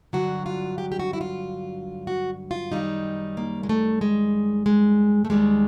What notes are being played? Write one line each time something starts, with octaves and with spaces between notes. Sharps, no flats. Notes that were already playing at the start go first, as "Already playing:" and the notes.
G2 D3 F#3 F#4
F4
G4
G4
F#4
E4
F4
F#4
F4
F#2 D#3 G3 D#4
A#3
G#3
A3
G#3
G#3
A3
D#2 D#3 G3 G#3